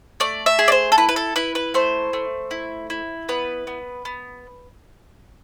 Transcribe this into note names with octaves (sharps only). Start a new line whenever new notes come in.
A3 D5
E5
G#4
D5
C5
A4
E4 B4
B4
A4
E4 B4
B4
A3 C5
A3
E4
E4
B3 B4
B3
B3